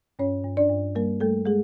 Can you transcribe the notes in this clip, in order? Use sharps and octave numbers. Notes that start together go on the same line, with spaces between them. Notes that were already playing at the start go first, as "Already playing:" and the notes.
G2 C#4 C#5
G2
D4 D5
G2
G3 A#3 A#4
G3 A3 A4
G#3 G#4